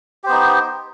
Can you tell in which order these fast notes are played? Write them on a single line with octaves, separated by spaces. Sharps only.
G4 C5 B3 D#4